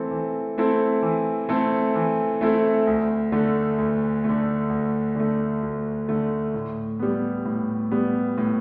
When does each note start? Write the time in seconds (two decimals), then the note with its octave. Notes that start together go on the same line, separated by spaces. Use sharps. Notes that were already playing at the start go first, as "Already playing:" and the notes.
Already playing: E3 A3 C4 E4 A4
0.11 E3
0.58 A3 C4 E4 A4
1.02 E3
1.49 A3 C4 E4 A4
1.95 E3
2.41 A3 C4 E4 A4
2.87 D2
3.32 D3 A3
3.78 D2
4.24 D3 A3
4.70 D2
5.16 D3 A3
5.62 D2
6.08 D3 A3
6.54 A2
6.99 G3 B3
7.45 A2
7.91 G3 B3
8.38 A2